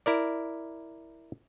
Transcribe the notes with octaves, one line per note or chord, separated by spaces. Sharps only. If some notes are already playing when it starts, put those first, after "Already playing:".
E4 A#4 D5